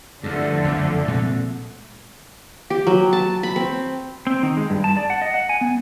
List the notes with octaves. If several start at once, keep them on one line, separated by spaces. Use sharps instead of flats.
E2 G2 D3 F3 A3
F#1 F2
A#2 G#3 C4
G4
F#3
A5
B5
C4
C4
D#3
G#3
G2
A5
D5
F#5
D#5
F#5
G#5
B3